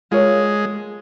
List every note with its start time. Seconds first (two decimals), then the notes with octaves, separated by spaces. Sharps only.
0.11 G#3 F4 A#4 C#5